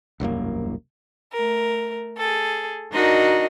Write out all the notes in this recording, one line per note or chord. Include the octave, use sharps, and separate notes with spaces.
E1 C2 F#2 A#3
A3 A#4
G#4 A4
D4 D#4 F#4 A#4 D#5